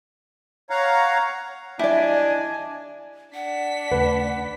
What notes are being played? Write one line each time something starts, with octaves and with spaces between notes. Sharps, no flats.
C#5 F5 F#5 A#5
D4 E4 G4 D5 D#5 G#5
D4 F#5 B6
D#2 C#3 A3 B4